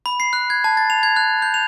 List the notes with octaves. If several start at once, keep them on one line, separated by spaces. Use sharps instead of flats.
B5
C7
F#6
G#6
A5
A6
F7
G#6
F#6
G6
F7